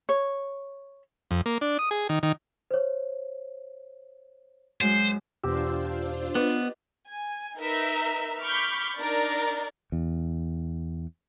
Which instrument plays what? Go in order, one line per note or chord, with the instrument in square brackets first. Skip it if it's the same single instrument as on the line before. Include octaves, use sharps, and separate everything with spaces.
[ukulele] C#5
[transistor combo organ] F2
A#3
D4
D#6
G#4
D#3
D#3
[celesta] C5 C#5
[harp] F#2 G#3 [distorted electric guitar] C5
[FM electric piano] E2 B2 E6 [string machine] D4 F4 C5 [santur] G4 A#5
[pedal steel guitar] B3 [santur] B4 D5 D#5
[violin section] G#5
D#4 A#4 B4 E5
B5 C#6 D6 F6 G6 B6
D4 D#4 A#4 D5
[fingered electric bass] E2